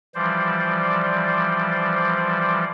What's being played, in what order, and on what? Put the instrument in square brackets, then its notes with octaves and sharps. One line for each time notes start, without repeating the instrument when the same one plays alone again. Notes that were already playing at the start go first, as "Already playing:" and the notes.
[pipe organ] E3 F3 G3 C5 D5